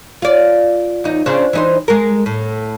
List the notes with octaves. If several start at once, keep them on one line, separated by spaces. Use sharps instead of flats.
F4 D5
E2 D#4
C#3 C4 D4
E3 D#4 C5
G#3 A#4
A2